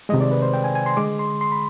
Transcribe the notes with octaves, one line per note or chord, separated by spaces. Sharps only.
C3 D#3 G#3 D#5
D5
B4
C5
G5
G#5
G#5
C6
D3 G#3 D6
C6
C6
B5